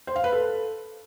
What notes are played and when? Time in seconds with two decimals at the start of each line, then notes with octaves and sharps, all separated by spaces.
0.07 C5
0.16 F5
0.24 B4
0.32 A4